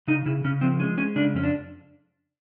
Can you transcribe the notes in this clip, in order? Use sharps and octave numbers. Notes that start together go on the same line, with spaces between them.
C#3 D#4
C#3 E4
C#3 C#4
F3 C4
G#3 C#4
G#3 C#4
C#3 D4
F2 C#4
D4